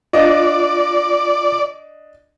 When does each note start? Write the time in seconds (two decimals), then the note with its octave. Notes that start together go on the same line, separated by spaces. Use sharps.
0.13 D4 F4 D5 D#5